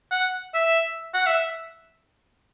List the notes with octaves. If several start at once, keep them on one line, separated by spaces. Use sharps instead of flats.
F#5
E5
F#5
E5